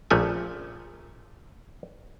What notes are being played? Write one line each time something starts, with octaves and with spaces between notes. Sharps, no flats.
A#1 A#2 F3 A3 C#4 G#5